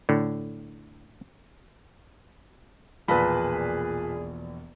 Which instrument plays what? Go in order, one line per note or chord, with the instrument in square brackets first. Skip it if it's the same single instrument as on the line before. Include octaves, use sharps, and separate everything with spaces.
[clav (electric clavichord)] A2 D3
[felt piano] E1 A#1 [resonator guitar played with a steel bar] A#2 [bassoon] G#4 [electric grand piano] B4 A5 B5